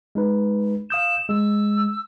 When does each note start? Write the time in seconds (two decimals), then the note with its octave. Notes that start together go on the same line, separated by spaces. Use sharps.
0.15 G#3 D#4 B4
0.90 F5 D#6 G6 E7
1.29 G#3 E6